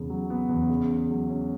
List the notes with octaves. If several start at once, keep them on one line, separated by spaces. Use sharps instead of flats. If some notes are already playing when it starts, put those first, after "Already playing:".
Already playing: E2 C#3 B3
F#3
B3
E2
C#3
C#3
F#3
C#4